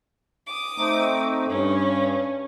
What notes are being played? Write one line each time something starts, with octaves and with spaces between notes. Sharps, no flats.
D6 D#6
A3 C4 D#4
G2 C#4